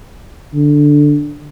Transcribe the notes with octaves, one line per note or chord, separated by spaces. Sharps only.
D3